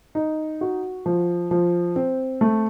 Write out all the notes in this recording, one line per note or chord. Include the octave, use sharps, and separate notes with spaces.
D#4
F#4
F3
F3
C4
A3